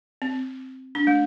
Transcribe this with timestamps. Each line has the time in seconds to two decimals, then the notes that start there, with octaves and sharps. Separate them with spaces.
0.22 C4
0.95 D4
1.07 A3